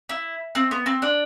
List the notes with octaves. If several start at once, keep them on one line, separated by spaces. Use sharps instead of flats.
E4
C4
B3
C4
D4